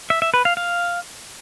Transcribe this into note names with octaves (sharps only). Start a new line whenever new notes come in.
E5
E5
B4
F5
F5